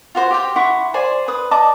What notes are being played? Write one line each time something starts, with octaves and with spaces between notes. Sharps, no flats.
F4 F#4 C5
G4 F5 G5
E4 F#5 C6 C#6
G#4 C5 D5 G#5
B4 D#6
D5 D#5 A5 D6